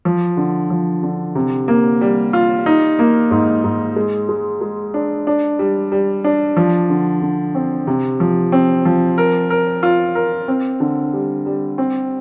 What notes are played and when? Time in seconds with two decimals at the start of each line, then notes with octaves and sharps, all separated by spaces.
0.05 F3
0.37 D3
0.70 F3
1.03 D3
1.35 C3
1.68 A#3
2.01 G3
2.33 F4
2.66 D#4
2.99 A#3
3.31 G#2
3.64 G#2
3.96 G#3
4.29 G#3
4.61 G#3
4.94 D4
5.27 D4
5.59 G3
5.92 G3
6.24 D4
6.57 F3
6.90 D3
7.22 D3
7.55 C4
7.87 C3
8.20 F3
8.52 C4
8.85 F3
9.18 A#4
9.50 A#4
9.83 F4
10.15 A#4
10.48 C4
10.80 D3
11.13 G3
11.46 G3
11.78 C4